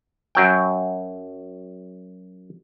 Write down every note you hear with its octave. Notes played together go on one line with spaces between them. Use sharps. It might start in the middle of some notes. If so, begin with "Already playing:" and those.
F#2 F#3 G5